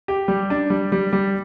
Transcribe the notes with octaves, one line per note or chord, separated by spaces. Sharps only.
G4
G3
D4
G3
G3
G3